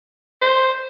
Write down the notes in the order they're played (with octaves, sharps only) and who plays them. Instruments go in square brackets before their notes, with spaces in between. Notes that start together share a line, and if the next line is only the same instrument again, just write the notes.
[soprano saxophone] C5